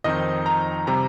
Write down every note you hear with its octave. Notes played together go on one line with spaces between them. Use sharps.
F2 D#3 C4 D#4 D#5
A#5
C3 G3 A#5